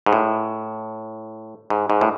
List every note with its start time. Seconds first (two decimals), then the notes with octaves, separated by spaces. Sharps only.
0.06 G#2
0.13 A2
1.70 G#2
1.90 G#2
2.01 A2